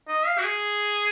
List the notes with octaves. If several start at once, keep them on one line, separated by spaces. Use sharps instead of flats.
D#5
F5
F#4
G#4